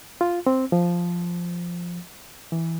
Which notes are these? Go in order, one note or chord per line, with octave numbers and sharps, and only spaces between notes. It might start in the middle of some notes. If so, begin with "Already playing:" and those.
F4
C4
F3
E3